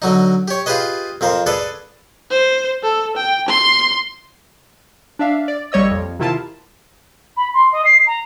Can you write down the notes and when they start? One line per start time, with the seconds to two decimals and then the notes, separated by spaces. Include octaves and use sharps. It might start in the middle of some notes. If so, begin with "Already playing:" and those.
0.02 D3 F#3 D#4
0.48 G4 C#5
0.66 F4 G4 G#4 B4 D#5
1.21 F2 F3 A#4 C5
1.46 G#4 A4 B4 D5
2.31 C5
2.83 A4
3.17 G5
3.48 C6
5.19 D4 D5 E5 F5
5.48 D5
5.72 A#1 G3 C#5 D#5 E6
5.91 F2
6.19 C3 D#3 E4 F4 A5
7.36 B5
7.54 C6
7.72 D#5
7.84 C7
8.06 A#5